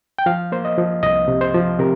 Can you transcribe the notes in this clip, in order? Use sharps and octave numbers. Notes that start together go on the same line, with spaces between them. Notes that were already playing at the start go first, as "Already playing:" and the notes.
G5
F3 F5
A#3 C5
D#5
F3
C2 D#5
C3
C5
F3
C3 A#4